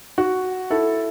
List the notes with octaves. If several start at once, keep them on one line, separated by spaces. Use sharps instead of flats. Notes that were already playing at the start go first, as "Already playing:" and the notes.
F#4
E4 A4